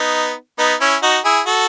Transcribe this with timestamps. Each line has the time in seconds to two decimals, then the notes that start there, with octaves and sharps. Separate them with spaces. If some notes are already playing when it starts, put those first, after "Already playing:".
Already playing: B3 D#4
0.59 B3 D#4
0.81 C#4 E4
1.03 D#4 F#4
1.25 E4 G#4
1.46 F#4 A4